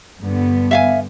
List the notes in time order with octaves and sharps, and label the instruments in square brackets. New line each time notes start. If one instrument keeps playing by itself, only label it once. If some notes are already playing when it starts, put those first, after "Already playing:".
[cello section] G2 D3 B3
[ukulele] E5 F5 G#5